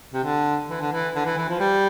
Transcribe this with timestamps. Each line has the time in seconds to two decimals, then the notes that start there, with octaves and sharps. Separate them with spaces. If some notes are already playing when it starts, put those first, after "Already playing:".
0.13 C3
0.24 D3
0.69 E3
0.81 D3
0.92 E3
1.15 D3
1.25 E3
1.37 E3
1.49 F3
1.59 G3